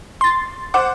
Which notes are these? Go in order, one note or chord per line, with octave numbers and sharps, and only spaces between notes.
C6 A6
C5 F#5 D6